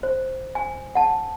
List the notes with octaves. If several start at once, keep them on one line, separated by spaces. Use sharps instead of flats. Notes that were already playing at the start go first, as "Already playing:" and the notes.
C5
G#5
F#5 A5